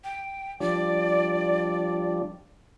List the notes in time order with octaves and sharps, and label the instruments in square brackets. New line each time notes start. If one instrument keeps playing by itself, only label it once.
[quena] G5
[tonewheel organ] F3 G3 D4 [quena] D5